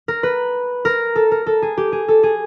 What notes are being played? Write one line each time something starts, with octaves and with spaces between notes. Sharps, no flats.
A#4
B4
A#4
A4
A#4
A4
G#4
G4
G#4
A4
G#4